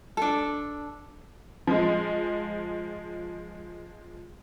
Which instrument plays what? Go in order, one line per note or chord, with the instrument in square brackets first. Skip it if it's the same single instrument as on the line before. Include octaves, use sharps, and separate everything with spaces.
[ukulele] D4 A4
[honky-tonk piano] F3 G#3